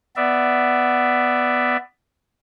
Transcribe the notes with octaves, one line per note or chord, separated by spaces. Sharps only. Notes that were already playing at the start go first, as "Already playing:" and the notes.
B3 D5 E5